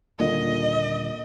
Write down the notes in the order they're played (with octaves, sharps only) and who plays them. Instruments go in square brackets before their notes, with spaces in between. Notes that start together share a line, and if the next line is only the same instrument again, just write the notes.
[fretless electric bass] D#1 A#2 D3 [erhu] D#5